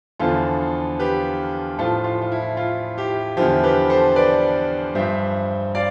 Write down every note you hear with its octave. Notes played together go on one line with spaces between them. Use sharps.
E2 D3 F3 F4 A4
G4 B4
A2 F3 F4 A4
F4
F4
E4
F4
E4 G4
E2 D3 F3 E4 G4
G4 B4
A4 C5
B4 D5
G2 F3 C5 E5
D5 F5